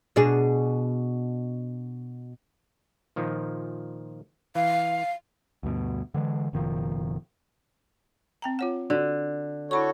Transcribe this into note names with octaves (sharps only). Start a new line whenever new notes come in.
B2 D4 G#4
A#2 D#3 F3
E3 F5
D2 G2 B2
D3 E3 G#3
F#1 B2 D#3 F3
C4 G5 A#5
F4 C#5 F#5
D3 F#4
E4 F#4 A4 C#5 B5 C#6